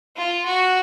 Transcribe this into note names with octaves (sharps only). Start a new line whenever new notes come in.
F4
F#4